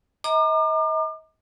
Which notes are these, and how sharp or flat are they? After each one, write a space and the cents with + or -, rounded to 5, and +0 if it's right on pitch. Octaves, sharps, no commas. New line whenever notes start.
D#5 +35 A#5 +0 D6 +40